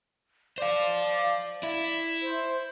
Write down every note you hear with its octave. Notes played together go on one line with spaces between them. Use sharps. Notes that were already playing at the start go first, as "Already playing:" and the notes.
C5 D5 F5
E4
C5